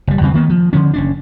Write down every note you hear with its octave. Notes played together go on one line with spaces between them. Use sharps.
F#1 G3
E2 C#3 G3 C4
D#3 A#3 B3
F3
D3 F3 C#4
F#1 C#4 D4